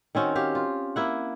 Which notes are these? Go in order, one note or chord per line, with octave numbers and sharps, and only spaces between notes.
D#3 C4 C#4 F#4
F#4 G4 F5
F4
A#3 E4 F#5